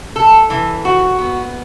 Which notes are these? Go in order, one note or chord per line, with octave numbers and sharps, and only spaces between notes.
A4
E3
F#4
B3